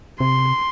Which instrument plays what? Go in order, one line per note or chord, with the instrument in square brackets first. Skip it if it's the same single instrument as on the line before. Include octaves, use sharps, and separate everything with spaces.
[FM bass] C3 [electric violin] C6